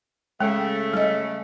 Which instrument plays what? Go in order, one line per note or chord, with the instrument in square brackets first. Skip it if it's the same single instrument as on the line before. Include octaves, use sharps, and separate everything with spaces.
[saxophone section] C#3 A3 [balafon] G#3
[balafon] G3 D#5